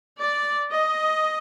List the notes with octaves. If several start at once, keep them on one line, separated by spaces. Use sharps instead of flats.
D5
D#5